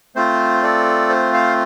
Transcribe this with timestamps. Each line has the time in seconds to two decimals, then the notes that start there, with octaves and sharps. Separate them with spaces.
0.15 A3 C4 F4 C5
0.62 A4 D5
1.09 C5
1.33 C5 F5